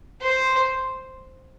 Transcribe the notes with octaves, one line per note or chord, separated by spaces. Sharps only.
C5